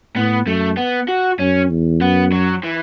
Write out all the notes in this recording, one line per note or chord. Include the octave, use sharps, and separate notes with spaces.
A2 B3
F#2 A3
B3
F#4
F#2 C#4
E2
F#2 B3
F#3
E3